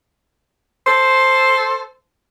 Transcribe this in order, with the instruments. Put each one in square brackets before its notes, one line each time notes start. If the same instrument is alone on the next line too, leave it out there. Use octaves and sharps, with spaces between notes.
[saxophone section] A4 C5